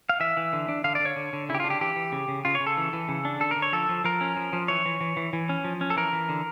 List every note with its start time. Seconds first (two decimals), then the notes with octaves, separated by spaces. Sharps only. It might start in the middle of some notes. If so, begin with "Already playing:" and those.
0.09 F5
0.20 E3 E5
0.37 E3
0.53 D3
0.68 D4
0.84 D3 F5
0.95 D5
1.00 D3
1.05 C#5
1.16 D3
1.33 D3
1.49 C#3 E4
1.55 G4
1.60 D4 F4
1.70 G4
1.81 E3 G4
1.96 E3
2.12 C#3
2.28 C#3
2.45 C#3 F4
2.55 C#5
2.60 C#3
2.67 A4
2.77 E3
2.93 E3
3.09 C#3
3.25 D4
3.40 D3 A4
3.51 A#4
3.56 D3
3.62 C#5
3.73 F3 A4
3.89 F3
4.04 F3 A#4
4.21 C#4
4.37 F3
4.53 F3
4.68 E3 C#5
4.86 E3
5.01 E3
5.17 E3
5.33 E3
5.49 C#4
5.64 F3
5.81 C#4
5.90 A4
5.96 E3 A#4
6.13 E3
6.29 D3